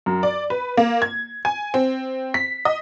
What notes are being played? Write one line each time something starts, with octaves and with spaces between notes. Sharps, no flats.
F#2
D5
B4
A#3
G#6
G#5
C4
B6
D#5